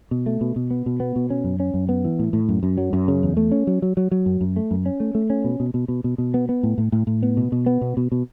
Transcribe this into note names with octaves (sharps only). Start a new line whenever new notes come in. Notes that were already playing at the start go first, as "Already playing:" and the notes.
B2
A3
B2
B2
B3
B2
B3
B2
C#4
F#2
C#4
F#2
B3
E3
A2
A2
F#2
F#2
F#3
F#2
C#3
E2
A3
C#4
F#3
F#3
F#3
F#3
F#2
F#2
A3
F#2
C#4
A3
A3
C#4
B2
B2
B2
B2
B2
B2
B3
B3
A2
A2
A2
A2
B3
B2
B2
B3
B2
B2
B2